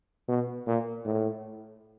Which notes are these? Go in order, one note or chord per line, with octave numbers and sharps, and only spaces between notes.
B2
A#2
A2